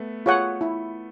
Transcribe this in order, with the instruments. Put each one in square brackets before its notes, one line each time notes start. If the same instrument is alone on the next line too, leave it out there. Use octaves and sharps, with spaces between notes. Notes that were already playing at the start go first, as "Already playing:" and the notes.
Already playing: [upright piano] A3 B3
[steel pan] F4 G#4 C#5 F#5
E4